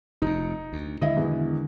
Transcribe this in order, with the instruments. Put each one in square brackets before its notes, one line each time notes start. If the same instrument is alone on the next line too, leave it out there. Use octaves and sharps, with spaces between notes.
[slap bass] F1 F2 [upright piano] D#4
[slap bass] D2
[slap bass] D3 D#3 G#3 [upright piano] E4 D#5
[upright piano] E2 B2